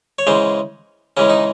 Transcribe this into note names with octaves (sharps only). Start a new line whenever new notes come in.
C#5
C#3 E3 G#3 C5
C#3 E3 G#3 C#4
D#4